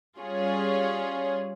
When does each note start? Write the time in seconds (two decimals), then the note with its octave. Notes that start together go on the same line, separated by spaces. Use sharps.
0.18 G3 C#4 F4 G#4 C#5